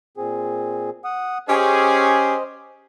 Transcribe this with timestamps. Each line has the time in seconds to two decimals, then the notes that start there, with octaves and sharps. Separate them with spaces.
0.17 A#2 C4 G#4
1.05 F#5 D#6
1.49 C#4 G4 G#4 C5 D#5